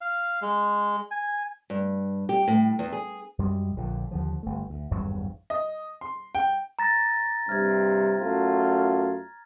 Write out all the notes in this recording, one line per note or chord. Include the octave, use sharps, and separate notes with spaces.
F5
G#3
G#5
G2
G4
A2
E2
G#4
F#2 G3 G#3
A#1 A#2 D3
D#2 D3 F3
G1 A3
D2
G#1 E2 G2 F#3
D#5
C6
G5
A#5 A6 A#6
G2 C3 F6 G#6
F#2 A3 F4